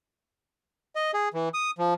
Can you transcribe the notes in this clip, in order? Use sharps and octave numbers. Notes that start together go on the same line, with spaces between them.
D#5
G#4
E3
D#6
F3